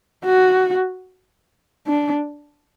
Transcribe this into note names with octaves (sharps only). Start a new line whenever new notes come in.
F#4
D4